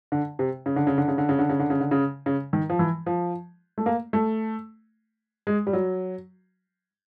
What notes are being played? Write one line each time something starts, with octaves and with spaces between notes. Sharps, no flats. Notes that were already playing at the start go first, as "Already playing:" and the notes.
D3
C3
C#3
D3
C#3
D3
C#3
D3
C#3
D3
C#3
D3
C#3
D3
C#3
C#3
D#3
F3
E3
F3
A3
A#3
A3
G#3
G3
F#3